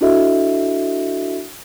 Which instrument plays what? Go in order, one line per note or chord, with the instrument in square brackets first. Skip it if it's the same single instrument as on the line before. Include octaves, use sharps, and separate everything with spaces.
[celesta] D4 E4 F#4 A4 D#5 E5